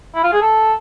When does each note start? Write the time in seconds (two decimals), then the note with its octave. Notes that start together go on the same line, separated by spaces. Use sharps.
0.15 E4
0.24 F4
0.33 G#4
0.42 A4